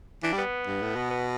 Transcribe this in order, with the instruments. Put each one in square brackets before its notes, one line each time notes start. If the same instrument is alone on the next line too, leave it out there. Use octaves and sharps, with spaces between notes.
[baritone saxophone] E3 [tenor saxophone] D4
[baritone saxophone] G3
[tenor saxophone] B3
[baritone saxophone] G2
A2
B2
[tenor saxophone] B3